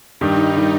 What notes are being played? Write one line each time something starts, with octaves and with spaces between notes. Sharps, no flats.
G2 D#3 G3 D#4
D#3 G3